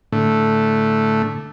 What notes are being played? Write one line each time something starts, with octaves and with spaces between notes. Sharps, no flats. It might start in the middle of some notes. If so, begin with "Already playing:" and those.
A2 D3 A3